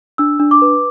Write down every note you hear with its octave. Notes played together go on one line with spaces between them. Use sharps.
D4 E6
D4
D6
B4